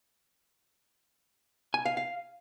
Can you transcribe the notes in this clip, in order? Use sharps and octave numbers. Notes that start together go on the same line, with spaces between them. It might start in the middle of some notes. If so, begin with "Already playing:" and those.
G#5
F5
F5